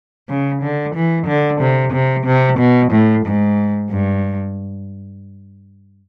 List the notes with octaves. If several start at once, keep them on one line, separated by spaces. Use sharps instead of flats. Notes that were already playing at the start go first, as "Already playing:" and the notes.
C#3
D3
E3
D3
C3
C3
C3
B2
A2
G#2
G2